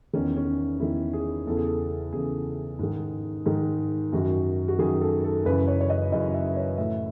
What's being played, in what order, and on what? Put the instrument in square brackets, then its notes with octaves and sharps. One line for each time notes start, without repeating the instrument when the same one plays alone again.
[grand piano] E2 D#3 C#4
C#4
E2 D#3 E4
G#4
E2 C#3 E3 A4
G#4
A4
E2 C#3 E3 G#4
G#2 D#3
G#2 D#3
F#2 D#3 F#4
F#4
F#2 D#3 G#4
A4
A4
F#2 C#3 E3 B4
C#5
C#5
D#5
F#2 C#3 E3 D#5
E5
C#5
A2 E3 E5